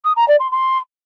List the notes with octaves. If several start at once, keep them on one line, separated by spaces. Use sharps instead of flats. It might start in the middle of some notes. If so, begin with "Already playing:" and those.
D#6
A#5
D5
C6
C6